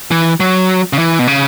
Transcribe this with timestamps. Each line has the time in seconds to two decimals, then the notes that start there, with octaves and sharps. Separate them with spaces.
0.11 E3
0.40 F#3
0.93 C#3
0.98 E3
1.19 B2
1.27 C#3